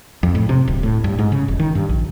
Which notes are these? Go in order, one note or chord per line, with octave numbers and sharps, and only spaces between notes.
F2
A2
C3
D1
A2
G2
G#2
C#3
F1
D#3
G2
A#1